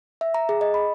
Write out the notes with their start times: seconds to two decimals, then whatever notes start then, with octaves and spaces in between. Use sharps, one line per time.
0.21 E5
0.34 A#5
0.49 G#4
0.61 D#5
0.74 B5